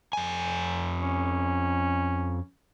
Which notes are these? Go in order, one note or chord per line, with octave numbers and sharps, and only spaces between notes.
F2 G#5
C#4